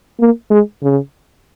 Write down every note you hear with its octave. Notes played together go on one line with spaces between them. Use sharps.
A#3
G#3
C#3